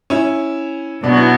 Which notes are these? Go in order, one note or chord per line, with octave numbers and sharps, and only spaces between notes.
C#4 E4
B2 F#3 B3 D4
E4